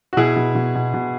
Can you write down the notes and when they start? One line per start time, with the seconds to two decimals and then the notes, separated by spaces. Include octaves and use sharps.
0.13 F#4
0.17 B2 E4 G#4
0.36 B2
0.55 B2
0.75 B2
0.94 B2